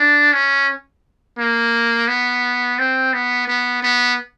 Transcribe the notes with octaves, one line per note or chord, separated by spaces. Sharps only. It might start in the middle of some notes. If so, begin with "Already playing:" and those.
Already playing: D4
C#4
A#3
B3
C4
B3
B3
B3